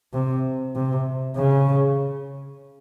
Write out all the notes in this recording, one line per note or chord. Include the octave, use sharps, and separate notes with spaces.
C3
C3
C#3